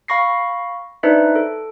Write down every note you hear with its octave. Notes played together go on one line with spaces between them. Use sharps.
F5 B5 C#6 A#6 C7
D4 D#4 B4 C5 D5 E5
A4